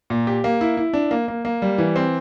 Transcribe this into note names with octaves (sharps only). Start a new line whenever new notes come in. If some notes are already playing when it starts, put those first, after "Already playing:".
A#2
G4
A#3
E4
E4
D4
A#3
A#3
A#3
G3
E3
C4